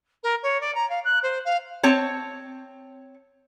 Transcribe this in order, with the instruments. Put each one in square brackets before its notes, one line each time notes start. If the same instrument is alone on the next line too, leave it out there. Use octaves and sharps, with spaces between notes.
[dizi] A#4
C#5
D5
A#5
F5
F#6
C5
F5
[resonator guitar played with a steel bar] C4 C#5 A5